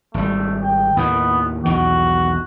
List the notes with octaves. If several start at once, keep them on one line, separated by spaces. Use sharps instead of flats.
G#1 G3 A3
G5
D#2 A2 D#3 B3
B1 E2 D#3 F#4